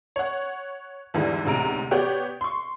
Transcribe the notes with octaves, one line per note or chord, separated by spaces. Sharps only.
C#5 F#5
E2 G#2 D3 E3 G3
A1 D2 G#2 C3 A#5 D7
B3 G4 C#5 D5 F#5
C6 C#6